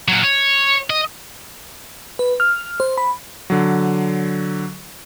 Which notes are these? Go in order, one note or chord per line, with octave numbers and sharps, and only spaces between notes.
A#2 F#3
C#5
D#5
B4
F6
C5
B5
D3 F#3